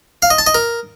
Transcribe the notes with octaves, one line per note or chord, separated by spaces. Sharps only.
F5
D#5
A5
D#5
A#4